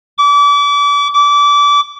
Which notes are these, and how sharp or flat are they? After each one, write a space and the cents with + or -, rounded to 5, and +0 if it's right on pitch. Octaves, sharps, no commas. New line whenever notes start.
D6 -35
D6 -25